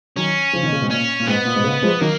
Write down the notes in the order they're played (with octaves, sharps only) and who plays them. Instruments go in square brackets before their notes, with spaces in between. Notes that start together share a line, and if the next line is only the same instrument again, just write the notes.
[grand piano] D#3 F#3 [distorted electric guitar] C#4
[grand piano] C#3 F3
B2 D#3
A#2 C#3
G#2 B2
[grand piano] A#2 [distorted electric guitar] C#4
[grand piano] A#2
[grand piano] G#2 [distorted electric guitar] B3
[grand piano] A#2
G#2 B2
A#2 C#3
F3 G#3
[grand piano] D#3 F#3 [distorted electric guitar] A#3